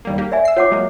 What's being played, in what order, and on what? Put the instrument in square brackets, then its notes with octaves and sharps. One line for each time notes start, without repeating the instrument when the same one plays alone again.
[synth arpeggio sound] D#2 G3 A#3
A#3 G4
[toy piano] D5 E5 G#5
[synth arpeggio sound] E6 C7
[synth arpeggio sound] F4 [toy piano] C#5 F#5 D6
[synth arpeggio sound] F#3 G#3 A#3